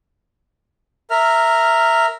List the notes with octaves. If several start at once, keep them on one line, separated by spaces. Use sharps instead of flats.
A#4 E5 F6